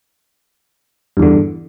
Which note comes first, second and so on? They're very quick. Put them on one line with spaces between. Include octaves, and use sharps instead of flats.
G2 E2 D3